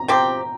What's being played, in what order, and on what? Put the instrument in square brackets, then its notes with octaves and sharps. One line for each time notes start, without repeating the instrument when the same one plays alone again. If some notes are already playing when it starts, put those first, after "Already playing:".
Already playing: [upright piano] A#5
[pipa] F3 C4 G4 [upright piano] G5